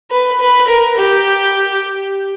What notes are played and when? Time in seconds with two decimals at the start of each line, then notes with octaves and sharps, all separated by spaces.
0.11 B4
0.40 B4
0.67 A#4
0.97 G4